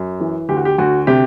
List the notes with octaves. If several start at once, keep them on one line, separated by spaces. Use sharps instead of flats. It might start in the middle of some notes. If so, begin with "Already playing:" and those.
Already playing: F#2
E3
D2 G4
F#4
G4
D2 F#4
C3 G4